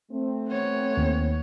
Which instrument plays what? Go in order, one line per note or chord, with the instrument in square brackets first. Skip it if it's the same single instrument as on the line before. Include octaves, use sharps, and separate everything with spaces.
[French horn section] A3 C4
[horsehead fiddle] B3 C#5
[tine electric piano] D#2